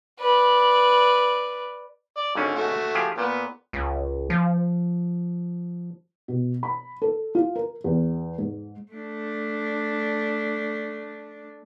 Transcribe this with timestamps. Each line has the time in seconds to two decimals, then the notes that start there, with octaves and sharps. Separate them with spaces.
0.20 B4 D5
2.17 D5
2.35 G#1 G#2 D3 C#4
2.55 A3 F#4
2.95 F3 G4 G#4
3.18 A#2 B3 B4
3.73 C#2
4.30 F3
6.28 B2
6.63 B5
7.02 A4
7.35 F4
7.56 A#4
7.84 E2
8.38 G#2
8.92 A3 D4